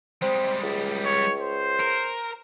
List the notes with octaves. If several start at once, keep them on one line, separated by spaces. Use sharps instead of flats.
G3 G#3 C4
C#2
C#5
C5
A#4